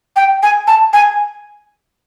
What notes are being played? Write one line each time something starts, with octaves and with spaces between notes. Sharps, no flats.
G5
G#5
A5
G#5